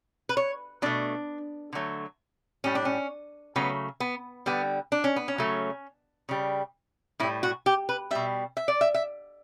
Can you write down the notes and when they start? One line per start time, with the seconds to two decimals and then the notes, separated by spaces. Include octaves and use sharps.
0.29 B4
0.37 C#5
0.82 B2 A3 D4
1.73 D3 F#3 A3
2.64 A2 G3 C#4
2.75 D4
2.85 C#4
3.56 C#3 F#3 A3 B3
4.00 B3
4.46 D3 G3 B3
4.92 D4
5.04 C#4
5.16 B3
5.28 C#4
5.38 C#3 F#3 A3
6.29 C#3 G3
7.20 A2 E4
7.23 G3
7.43 F#4
7.66 G4
7.89 B4
8.11 B2 G3 E5
8.57 E5
8.68 D5
8.81 E5
8.94 E5